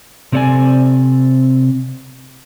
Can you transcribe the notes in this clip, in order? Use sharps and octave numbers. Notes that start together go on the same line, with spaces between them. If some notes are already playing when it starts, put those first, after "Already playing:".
C3 C4 A4 C#5 D5 G#5